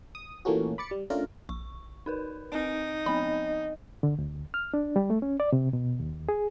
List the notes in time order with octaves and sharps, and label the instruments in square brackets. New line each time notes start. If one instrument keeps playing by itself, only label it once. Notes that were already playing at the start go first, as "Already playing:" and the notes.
[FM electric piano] D#6
A#2 E3 A3 A#3 C#4 F#4
B5 D6 A6 C#7
G3
A3 C#4 D4 F4 A#4
[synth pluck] A#1 [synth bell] C#6
[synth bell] D#4 A#4 B4
[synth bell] C4 D7 [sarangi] D#4
[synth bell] F3 B3 C4 [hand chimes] D#5 [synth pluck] B5
[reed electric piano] D3
D2
F6
D4
G3
A3
C#4
D5
C3
B2
D#2
G#4